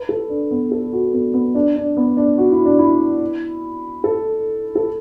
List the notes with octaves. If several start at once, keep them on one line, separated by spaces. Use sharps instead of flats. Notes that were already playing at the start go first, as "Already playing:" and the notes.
Already playing: B4
A4
D4
B3
A4
F#4
B3
B3
D4
D4
B3
D4
F#4
E4
D4
E4
A4
A4